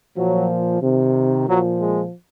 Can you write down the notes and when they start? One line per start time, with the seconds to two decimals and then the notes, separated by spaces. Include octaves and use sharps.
0.17 A#2 F3 F#3
0.81 C3 D#3
1.46 A#2 F3 F#3
1.80 G#3